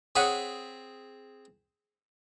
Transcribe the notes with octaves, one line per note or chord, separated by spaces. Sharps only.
C4 G#4 C#5 F#5 B5 D#6